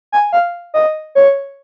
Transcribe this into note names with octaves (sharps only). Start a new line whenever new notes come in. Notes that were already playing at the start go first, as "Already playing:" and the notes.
G#5
F5
D#5
C#5